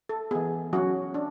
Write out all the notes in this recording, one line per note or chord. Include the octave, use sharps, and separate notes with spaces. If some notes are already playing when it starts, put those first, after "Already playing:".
A4
E3 B3 G#4
F#3 C#4 F#4
D4